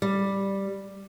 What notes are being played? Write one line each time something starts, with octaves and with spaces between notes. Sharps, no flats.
G3